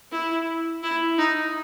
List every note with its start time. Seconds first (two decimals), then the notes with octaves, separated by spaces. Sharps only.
0.12 E4
0.83 E4
1.18 D#4